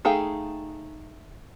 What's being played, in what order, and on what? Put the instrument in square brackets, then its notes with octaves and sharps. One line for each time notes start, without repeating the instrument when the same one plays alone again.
[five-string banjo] A3 D#4 G#4 F5 G5